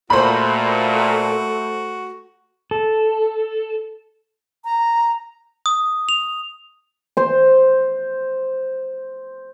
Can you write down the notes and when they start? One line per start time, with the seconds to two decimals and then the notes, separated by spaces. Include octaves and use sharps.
0.10 A#2 A3 F#4 C5 B5
2.71 A4
4.64 A#5
5.66 D#6
6.09 F7
7.17 C5 C6